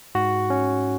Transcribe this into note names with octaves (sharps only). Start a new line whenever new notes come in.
G#2 F#4
C#4